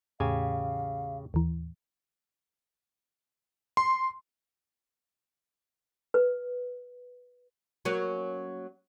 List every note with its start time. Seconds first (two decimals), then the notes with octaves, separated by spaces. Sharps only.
0.20 E2 A2 C#3 G4 F5 G#5
1.34 D#2 E3
3.77 C6
6.14 B4
7.85 F#3 A#3 C#4